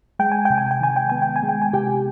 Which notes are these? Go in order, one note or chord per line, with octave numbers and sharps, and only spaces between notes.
G#3 G5
G#5
C3 G5
G#5
G5
D#3 G#5
G5
B3 G#5
G5
G#5
G#3
G5
G#5
C3 G4 G5